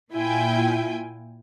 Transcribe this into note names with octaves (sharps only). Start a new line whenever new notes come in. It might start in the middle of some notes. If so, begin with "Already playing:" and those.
A#2 E4 F4 G5 G#5